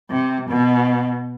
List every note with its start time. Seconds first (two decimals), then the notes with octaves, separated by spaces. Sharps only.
0.11 C3
0.50 B2